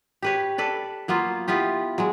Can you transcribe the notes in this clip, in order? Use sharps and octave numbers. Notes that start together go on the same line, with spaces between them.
G4 B4 C#5
A4 B4 D5
F#3 A#3 B3 F4
B3 E4 F4 G4
F#3 G#3